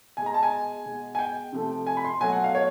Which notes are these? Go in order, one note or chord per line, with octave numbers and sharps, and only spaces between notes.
B2 G#3 G#5
A#5
A5
G#5
B2 G#3
G#5
G5
C3 F3 A3
G#5
B5
C6
B2 F#3 A3 G#5
F#5
F5
C#5